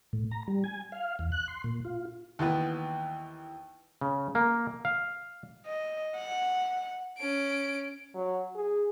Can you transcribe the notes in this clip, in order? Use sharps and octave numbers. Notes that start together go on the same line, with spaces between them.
A2
A#5
G3
G#5
F5
E2
F#6
C6
A#2
F4
D#2 E3 B3 B4
C#3
A#3
F5
D#5
F#5
C#4 D7
F#3
G#4